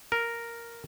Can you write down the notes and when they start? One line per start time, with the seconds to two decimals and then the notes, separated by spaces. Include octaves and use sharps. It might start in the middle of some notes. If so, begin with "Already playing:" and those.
0.12 A#4